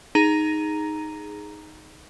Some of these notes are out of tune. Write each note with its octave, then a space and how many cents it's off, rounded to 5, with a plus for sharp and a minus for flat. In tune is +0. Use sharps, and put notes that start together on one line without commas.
D#4 +0 G#4 +0 A#5 +0